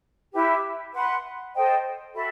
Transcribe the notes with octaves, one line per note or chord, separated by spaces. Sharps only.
E4 G4 B4 E5
B4 F#5 C6
A4 C5 D#5 G5
F#4 A4 E5 B5